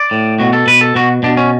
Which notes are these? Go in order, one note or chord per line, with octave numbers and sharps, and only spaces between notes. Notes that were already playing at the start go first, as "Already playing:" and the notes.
Already playing: D5
A2
B2 F#4
A4
B2 B4
A4
B2 F#4
B2 D4
C#4